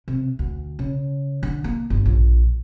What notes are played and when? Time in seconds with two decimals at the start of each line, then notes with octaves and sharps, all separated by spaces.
0.08 C3
0.39 D2
0.79 C#3
1.43 D3
1.64 A#3
1.90 G1
2.06 A#1